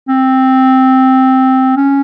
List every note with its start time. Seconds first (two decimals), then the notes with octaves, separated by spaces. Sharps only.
0.09 C4
1.77 C#4